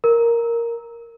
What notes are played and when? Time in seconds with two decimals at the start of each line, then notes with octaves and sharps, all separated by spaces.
0.04 A#4